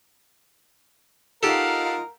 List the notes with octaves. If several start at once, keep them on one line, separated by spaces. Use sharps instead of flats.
D#4 F4 G4 A4 A#4 F5 F#5